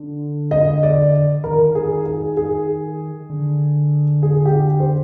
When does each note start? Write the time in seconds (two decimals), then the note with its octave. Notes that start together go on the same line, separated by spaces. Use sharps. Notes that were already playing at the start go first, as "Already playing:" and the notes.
Already playing: D3
0.51 D#5
0.83 D5
1.44 D#3 A#4
1.75 G#4
2.06 G#4
2.37 G#4
3.30 D3
4.23 G#4
4.45 G4
4.80 C5